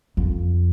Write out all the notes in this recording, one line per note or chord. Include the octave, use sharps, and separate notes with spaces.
F2